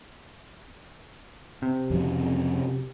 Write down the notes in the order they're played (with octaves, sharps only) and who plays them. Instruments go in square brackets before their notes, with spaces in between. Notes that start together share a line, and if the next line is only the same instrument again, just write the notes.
[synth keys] C3
[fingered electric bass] F2 C#3 F#3